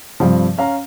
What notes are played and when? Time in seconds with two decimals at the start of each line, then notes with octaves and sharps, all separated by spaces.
0.20 G2 C3 F3
0.57 C#4 F5 A#5